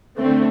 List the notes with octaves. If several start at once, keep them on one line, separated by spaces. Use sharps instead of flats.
D3 A3 C4